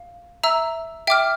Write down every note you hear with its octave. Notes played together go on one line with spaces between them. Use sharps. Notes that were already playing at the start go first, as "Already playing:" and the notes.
Already playing: F5
E5 A#5 E6
E5 G5 D6 F6